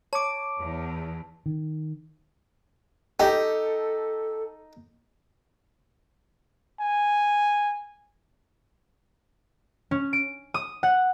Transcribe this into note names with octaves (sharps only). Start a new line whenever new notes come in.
C#5 A5 D6 D7
E2
D#3
D#4 G4 A4
G#5
C#4
D7
D#6
F#5